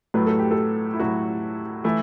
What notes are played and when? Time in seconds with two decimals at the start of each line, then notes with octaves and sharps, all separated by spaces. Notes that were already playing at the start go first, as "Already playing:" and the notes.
0.14 A2 F#3 A3 B4
0.27 A4
0.39 G4
0.51 A4
0.94 E4
0.99 A2 F#3 A3 F#4
1.84 E3 A3 E4